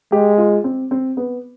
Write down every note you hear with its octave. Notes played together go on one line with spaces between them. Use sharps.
G#3 G4
F4
C4
C4
B3